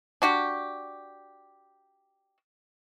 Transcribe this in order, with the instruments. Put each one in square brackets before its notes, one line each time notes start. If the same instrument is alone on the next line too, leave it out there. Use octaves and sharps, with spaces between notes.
[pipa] D4 F#4 G4